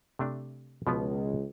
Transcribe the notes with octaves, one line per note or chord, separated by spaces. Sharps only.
C3 A3 D4
C#2 B2 F3 B3